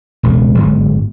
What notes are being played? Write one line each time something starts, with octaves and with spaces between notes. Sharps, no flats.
E1 C#2 A2
G1 G#2 F#3